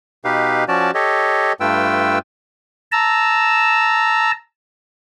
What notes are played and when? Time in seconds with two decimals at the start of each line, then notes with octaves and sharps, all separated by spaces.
0.25 B2 D#4 G4 B4 F5
0.68 F3 C#4 F#4 D5 A5
0.94 G4 A4 C#5 D#5
1.60 G2 A3 F4 B4 G5 E6
2.92 A5 A#5 E6